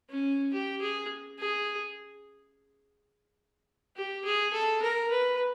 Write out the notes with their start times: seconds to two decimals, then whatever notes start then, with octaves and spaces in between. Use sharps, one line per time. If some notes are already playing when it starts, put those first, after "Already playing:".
0.10 C#4
0.53 G4
0.81 G#4
1.39 G#4
3.96 G4
4.25 G#4
4.53 A4
4.82 A#4
5.11 B4